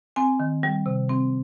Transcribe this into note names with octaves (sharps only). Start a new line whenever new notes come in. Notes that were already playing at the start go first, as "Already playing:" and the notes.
C4 G#5
D#3
G3
C3
C4